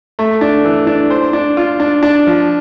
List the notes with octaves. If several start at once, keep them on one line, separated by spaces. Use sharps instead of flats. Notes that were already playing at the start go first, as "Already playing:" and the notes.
A3
D4
E3
D4
C5
D4
F4
D4
D4
F3